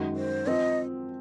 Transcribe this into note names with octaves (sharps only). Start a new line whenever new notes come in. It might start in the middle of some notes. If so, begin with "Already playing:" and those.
Already playing: F#2 D#3 G#3 D#4 F#4
C5
F3 C4 D#5